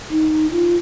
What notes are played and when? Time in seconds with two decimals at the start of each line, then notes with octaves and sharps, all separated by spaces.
0.11 D#4
0.51 F4